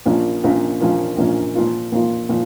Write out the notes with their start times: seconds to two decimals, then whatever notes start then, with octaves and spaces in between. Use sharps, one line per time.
0.06 A#1 A#2 F3 A#3 C#4
0.44 A#1 A#2 F3 A#3 C#4
0.80 A#1 A#2 F3 A#3 C#4
1.17 A#1 A#2 F3 A#3 C#4
1.55 A#2 F3 A#3 F4
1.92 A#2 F3 A#3 F4
2.29 A#2 F3